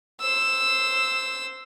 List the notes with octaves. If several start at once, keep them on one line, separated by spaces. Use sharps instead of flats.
C5 E6